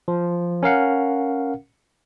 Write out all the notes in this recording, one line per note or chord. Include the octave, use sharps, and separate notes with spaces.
F3
C#4 A#4 F5 F#5